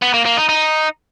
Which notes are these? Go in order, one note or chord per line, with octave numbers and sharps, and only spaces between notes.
B3
A#3
A#3
D#4
D#4